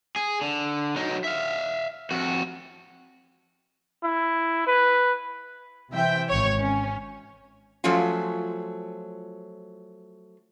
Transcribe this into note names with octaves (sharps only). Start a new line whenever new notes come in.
G#4
D3
F#3 D#4
E5 F5
F2 F#4
E4
B4
C3 E3 C4 E5 G5
G#1 C#5
C#4
F3 F#3 A3 C#4 F4